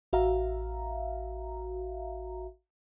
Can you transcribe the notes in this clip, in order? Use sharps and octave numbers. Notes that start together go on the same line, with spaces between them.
A1 F#4 E5 F5 A#5